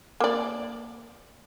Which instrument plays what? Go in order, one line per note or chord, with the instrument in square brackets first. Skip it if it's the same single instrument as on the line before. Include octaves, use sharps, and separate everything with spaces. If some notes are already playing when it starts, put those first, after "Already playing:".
[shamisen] A#3 D5